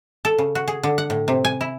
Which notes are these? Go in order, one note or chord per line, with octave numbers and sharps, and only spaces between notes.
A4
C#3
F#4
G#4
D3
F#5
A2
C3
G#5
E4